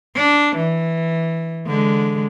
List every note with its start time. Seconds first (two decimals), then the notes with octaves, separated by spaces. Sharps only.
0.15 D4
0.56 E3
1.67 D3 G#3